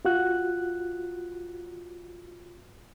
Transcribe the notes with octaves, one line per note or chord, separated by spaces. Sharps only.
F4 F#4 F#6